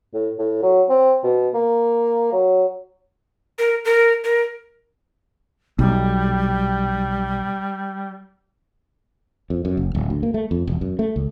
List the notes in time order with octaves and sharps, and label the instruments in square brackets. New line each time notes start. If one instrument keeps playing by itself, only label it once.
[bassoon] A2
A2
F#3
C4
B2
A#3
F#3
[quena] A#4
A#4
A#4
[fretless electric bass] B1 [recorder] G3
[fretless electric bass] F2
F#2
F#1
D1
D2
A#3
A3
F2
E1
F#2
A3
C#2